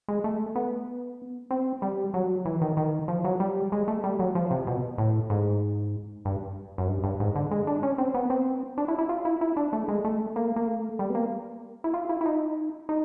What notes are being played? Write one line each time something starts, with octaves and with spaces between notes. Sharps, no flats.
G#3
A3
B3
C4
G3
F#3
E3
D#3
D#3
F3
F#3
G3
G#3
A3
G3
F#3
F3
C3
B2
A2
G#2
G2
F#2
G2
G2
G#2
D3
G#3
D4
C#4
C4
B3
C4
D4
E4
E4
F4
E4
E4
D4
A3
G#3
A3
A#3
A#3
A3
G3
B3
A#3
E4
F4
E4
E4
D#4
D#4